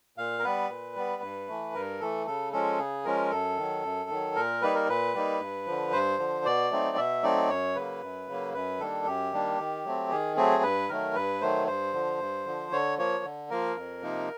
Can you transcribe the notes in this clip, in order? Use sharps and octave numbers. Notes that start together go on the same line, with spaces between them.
A#2 F5
A#4
G3 B3 B4
A#2
G3 B3
G2
E3 A3
G2 A#4
E3 A3 A4
C#3 A4
F3 G#3 C#4 A4
C#3 G#4
F3 G#3 C#4 A#4
F#2 A4
D#3 F#3
F#2
D#3 F#3
A#2 A#4
G3 A#3 D#4 B4
A#4
A#2 B4
G3 A#3 D#4
G2
D3 F3
G2 C5
D3 F3
B2 D5
F#3 A3 C4 D#4
B2 E5
F#3 A3 C4 D#4 D5
F#2 C#5
C#3 F#3 A#3 B4
F#2
C#3 F#3 A#3
F#2 B4
D#3 G3 A#3 D4 A4
F#2 G4
D#3 G3 A#3 D4
D#3
F#3 A3 C4
D#3 G#4
F#3 A3 C4 G#4
G2 B4
D#3 F#3 A3 A#4
G2 B4
D#3 F#3 A3 C5
G2 C5
D3 F3
G2
D3 F3
D3 C#5
F3 A#3 C#5
D3
F3 A#3 A#4
F2
C3 F3 A#3 D#4